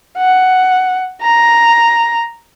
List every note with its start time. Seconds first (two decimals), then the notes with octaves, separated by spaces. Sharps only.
0.18 F#5
1.22 A#5